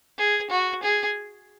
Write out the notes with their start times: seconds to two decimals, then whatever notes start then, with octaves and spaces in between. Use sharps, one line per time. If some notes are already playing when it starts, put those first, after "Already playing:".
0.18 G#4
0.50 F#4
0.83 G#4